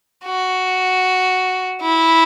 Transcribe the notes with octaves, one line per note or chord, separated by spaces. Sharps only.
F#4
E4